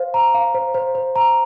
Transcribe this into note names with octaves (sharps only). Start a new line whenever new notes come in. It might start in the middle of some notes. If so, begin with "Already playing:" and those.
Already playing: C5 F5
A#5
F5
C5
C5
C5
A#5